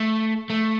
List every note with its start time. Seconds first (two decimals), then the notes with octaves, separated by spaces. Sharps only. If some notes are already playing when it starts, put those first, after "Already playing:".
Already playing: A3
0.50 A3